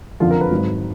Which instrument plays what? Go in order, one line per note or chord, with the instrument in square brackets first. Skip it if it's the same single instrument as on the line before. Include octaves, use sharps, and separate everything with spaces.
[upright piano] F#1 F2 D3 F3 F4
A#4
B4
G#1 G#2 F#3